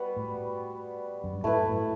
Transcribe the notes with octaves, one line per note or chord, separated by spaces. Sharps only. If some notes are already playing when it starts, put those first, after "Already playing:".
Already playing: G3 B3 F#4 B4
A2
F#2
G2
A2 A3 E4 B4
A2